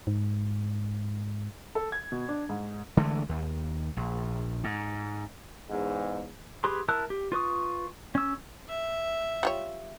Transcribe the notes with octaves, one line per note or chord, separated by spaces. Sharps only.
G#2
A4
G#6
B2
D4
G#2
D3 E3 G#3 A3
D#2
A#1
G#2
E2 G#2
G4 G#4 B4 B5 C6
E4 A#4 A5 E6 F#6
G4
F4 B4 C#6 D#6
C#4 E6
E5
G3 F4 C#5